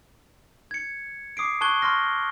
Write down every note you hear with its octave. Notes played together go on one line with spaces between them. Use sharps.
G#6 C#7
D6 D#6 C7 D7
A5 C#6 F#6 G#6 G7
C6 C#6 F6 A#6